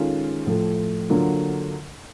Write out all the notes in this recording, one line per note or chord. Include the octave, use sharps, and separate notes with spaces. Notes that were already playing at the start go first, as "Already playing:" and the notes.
Already playing: D#3 G#3 C#4 F4 A4
A2 F3 A3
D3 F#3 A#3 D4 F4